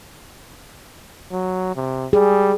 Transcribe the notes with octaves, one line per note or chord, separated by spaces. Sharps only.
F#3
C3
G3 G#4